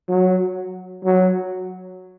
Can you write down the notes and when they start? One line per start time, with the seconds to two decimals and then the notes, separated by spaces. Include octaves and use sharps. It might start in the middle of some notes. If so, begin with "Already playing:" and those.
0.08 F#3
1.04 F#3